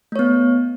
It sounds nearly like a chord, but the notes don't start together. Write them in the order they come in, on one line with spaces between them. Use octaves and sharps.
A3 C#5 B3